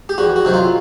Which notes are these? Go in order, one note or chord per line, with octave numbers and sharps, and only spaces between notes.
G4
E2 F#4
F#4
C3 D#3 F#3
F4